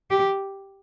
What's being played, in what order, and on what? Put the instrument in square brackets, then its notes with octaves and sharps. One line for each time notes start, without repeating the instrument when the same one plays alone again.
[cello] G4